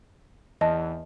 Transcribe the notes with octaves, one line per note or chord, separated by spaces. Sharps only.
E2 D#5 A5